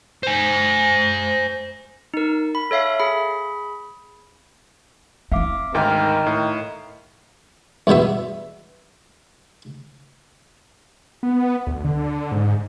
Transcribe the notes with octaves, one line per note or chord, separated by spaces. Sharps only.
C5 G#5
D#4 A#4
B5
A4 C#5 E5 F5
G#4 B5
C4 E4 E5 F5 D6
D2 G#2 D#3 A#4 F5 G5 F6
A2
E2 G2 B2 B3 E5
B3
D2
D3
G#2